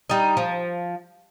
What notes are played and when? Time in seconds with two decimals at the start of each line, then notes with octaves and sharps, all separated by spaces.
0.09 G3 D#4
0.37 F3